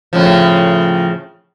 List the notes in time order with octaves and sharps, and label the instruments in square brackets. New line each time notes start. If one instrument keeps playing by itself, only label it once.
[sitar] A2 C#3 F3